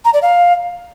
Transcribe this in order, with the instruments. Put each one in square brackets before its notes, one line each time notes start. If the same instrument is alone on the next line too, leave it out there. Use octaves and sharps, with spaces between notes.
[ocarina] A#5
D5
F5